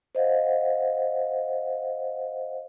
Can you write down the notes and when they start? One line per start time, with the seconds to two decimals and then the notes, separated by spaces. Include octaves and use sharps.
0.15 C5 D#5 F5 F#5